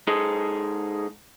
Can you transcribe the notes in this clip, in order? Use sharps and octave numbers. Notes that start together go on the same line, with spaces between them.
G#3 D#4 G#4 A4